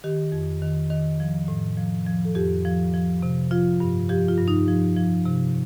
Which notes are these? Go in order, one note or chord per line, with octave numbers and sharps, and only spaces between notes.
D#3 G4
F2
D#3
D#3
F3
A2
F3
F3
A4
F2 G4
F3
F3
C3
F3 F4
G2
F3 G4
F4
G2
D#4
F3
F3
C3